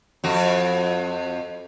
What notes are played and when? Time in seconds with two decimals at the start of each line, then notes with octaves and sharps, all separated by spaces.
0.24 F2 F#4